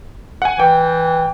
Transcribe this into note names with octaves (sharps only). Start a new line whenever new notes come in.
F#5 G#5
E3 G5